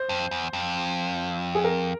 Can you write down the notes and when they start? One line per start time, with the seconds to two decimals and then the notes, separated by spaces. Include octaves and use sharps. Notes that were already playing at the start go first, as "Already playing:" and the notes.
Already playing: C5
0.09 F2
0.31 E2
0.53 F2
1.55 G#4
1.64 A#4